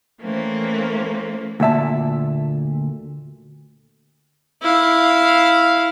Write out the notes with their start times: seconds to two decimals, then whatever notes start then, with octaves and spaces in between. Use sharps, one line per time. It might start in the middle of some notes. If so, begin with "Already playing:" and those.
0.21 E3 A3 A#3 C4 C#4
1.60 D2 A#2 E5 A5
4.62 E4 F5